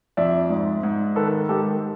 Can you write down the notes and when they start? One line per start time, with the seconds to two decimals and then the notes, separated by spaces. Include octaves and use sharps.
0.17 F2 D5 E5
0.50 G#2
0.83 G#2
1.16 D#3 A4 B4
1.49 G#2 G4 A4